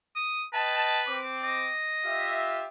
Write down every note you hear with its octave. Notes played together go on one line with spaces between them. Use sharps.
D#6
B4 D#5 G5 A5
C4 D6
D#5
F4 G4 E5